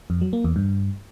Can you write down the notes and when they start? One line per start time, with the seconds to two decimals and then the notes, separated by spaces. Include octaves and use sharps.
0.10 F2
0.21 F#3
0.33 A#3
0.44 E2
0.56 G2